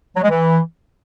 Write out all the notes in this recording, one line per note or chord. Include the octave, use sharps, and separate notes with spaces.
F#3
G#3
E3